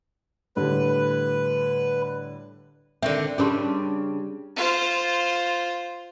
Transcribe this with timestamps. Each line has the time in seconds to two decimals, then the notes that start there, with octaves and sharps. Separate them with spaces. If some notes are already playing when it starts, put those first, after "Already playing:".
0.56 A2 D3 G3 B4
3.03 D3 D#3 C4 E5
3.38 C#3 G3 C#4 D4 A#4 C6
4.57 F4 C5